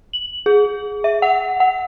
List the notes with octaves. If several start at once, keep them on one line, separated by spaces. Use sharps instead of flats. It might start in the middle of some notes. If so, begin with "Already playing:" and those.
F#7
G#4
E5
F#5
F#5